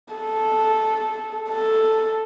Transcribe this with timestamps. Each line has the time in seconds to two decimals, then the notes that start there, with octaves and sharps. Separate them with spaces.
0.13 A4
1.50 A4